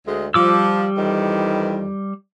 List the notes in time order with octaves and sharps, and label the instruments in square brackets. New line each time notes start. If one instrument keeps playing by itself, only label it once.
[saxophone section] D2 G#3
[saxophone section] F3 [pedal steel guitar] G3 D6 E6
[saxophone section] F2 D#3 E3